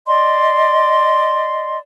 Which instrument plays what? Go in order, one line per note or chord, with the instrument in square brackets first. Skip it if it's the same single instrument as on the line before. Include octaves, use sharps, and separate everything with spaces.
[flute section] D5 D#5 C6